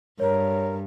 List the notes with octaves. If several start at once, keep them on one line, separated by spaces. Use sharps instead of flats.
G2 A#4 C#5